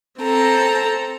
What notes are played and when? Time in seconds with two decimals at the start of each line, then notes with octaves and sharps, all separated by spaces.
0.21 C4 A4 A#5